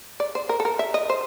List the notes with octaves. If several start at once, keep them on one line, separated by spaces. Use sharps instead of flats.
D5
C5
A#4
A4
A#4
E5
D#5
C5